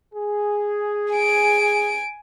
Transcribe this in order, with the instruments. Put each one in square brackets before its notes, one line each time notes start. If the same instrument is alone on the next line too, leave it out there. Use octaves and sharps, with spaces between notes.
[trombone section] G#4
[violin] G#5 D7